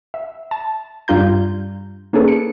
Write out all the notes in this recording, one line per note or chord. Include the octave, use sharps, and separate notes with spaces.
E5
A5
G2 G3 D4 F4 A#5 G6
A#3 C#4 D4 G#4 A4 B4
C#7